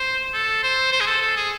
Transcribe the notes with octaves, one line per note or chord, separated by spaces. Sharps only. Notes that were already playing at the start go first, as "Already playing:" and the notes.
Already playing: C5
A4
C5
C5
G#4
A4
A4
G#4